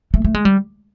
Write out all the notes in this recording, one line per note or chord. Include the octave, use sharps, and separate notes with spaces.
A3
A3
G#3
G3